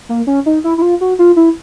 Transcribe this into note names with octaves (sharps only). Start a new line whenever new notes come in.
A#3
C#4
D#4
E4
E4
F4
F#4
F4
E4